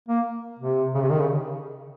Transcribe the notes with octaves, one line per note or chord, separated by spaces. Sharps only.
A#3
C3
C#3
C3
D#3
C#3